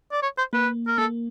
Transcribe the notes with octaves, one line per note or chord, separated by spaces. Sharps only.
D5
C#5
C5
A#3 B4
A#4
A#3 A4